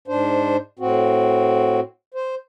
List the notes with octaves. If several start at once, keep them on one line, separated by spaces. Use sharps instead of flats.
G#2 D4 C5
A2 C4 F#4
C5